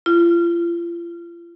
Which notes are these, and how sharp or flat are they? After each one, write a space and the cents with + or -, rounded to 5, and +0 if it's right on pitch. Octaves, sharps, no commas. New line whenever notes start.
F4 -40